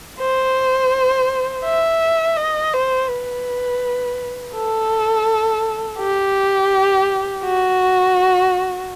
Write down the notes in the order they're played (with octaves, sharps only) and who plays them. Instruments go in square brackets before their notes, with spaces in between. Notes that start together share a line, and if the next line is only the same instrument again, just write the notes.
[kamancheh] C5
E5
D#5
C5
B4
A4
G4
F#4